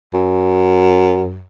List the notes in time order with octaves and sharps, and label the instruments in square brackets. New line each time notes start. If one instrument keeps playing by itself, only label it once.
[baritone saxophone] F#2